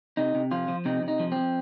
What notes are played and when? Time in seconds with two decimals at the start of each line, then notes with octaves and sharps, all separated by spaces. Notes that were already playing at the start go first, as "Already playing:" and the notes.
0.17 C3 D#4
0.35 C3
0.51 F3 F4
0.68 F3
0.85 C3 D#4
1.03 C3
1.08 D#4
1.19 F3
1.32 F3 C4